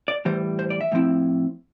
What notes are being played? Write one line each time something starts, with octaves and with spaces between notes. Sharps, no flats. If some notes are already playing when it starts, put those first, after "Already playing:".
D5
A2 E3 G3 C5
C5
D5
E5
A2 F3 C4 E4